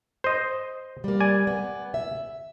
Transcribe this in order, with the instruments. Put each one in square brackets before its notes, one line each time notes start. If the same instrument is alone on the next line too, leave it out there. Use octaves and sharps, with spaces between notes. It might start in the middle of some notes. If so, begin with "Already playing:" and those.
[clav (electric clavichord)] C5 D#5
[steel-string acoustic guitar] G3 A#3
[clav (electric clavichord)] D5 G#5
[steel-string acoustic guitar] B3
E5